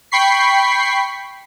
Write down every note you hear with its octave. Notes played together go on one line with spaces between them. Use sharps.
G5 B5 C#6 B6 C7